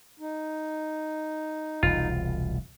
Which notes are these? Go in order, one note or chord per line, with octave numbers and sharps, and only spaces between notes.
D#4
E1 C2 F4